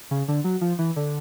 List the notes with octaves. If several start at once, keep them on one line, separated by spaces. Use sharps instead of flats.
C#3
D3
F#3
F3
E3
D3